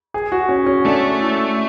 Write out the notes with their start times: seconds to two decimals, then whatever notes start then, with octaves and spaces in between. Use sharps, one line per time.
0.14 G#4
0.32 F#4
0.49 C#4
0.66 C#4
0.85 A3 D4
1.20 E4